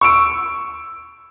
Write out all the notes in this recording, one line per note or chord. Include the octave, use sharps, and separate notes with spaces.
C#6 E6 D7